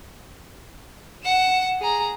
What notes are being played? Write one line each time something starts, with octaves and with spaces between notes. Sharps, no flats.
F#5 E7
G#4 A#5